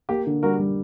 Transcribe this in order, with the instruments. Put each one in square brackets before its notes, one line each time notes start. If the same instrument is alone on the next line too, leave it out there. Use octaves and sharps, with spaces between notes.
[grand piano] A#3 [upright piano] G4
[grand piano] D3
[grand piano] G3 [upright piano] F#4 A#4
[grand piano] G3